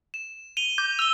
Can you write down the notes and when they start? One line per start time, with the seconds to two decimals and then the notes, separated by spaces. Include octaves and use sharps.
0.14 E7
0.57 D#7 F7 G7
0.78 D6 G6
0.99 E6 F7 G7